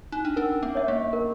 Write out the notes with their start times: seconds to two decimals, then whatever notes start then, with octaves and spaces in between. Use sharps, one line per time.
0.12 D#4
0.25 D4
0.36 C#4 A#4
0.63 B3
0.75 C#5 E5
0.88 A#3
1.13 A#4